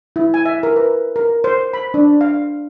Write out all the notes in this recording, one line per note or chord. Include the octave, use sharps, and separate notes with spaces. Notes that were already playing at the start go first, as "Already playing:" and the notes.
E4
G#5
E5
A#4
B4
A#4
C5
B5
D4
F5